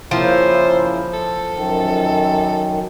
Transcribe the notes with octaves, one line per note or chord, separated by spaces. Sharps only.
C#3 F3 A#3 E4 C5
A4
F#2 D#3